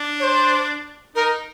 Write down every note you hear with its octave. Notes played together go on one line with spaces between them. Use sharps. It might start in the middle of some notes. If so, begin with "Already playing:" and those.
Already playing: D4
C#5
C5
D#4 A#4